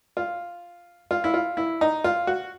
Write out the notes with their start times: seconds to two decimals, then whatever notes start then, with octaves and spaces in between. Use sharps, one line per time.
0.17 F4
1.11 F4
1.24 E4
1.34 F4
1.57 E4
1.81 D#4
2.04 F4
2.27 F#4